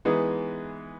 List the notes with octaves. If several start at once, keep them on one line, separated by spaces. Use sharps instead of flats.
E3 G#3 B3 D#4 G#4